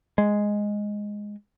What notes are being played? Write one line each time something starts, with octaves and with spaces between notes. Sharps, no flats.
G#3